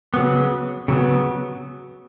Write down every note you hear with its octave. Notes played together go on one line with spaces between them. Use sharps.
C#3 F#3 B3
C#3 F#3 B3